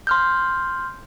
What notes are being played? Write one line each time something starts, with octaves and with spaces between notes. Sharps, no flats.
C6 F6 G6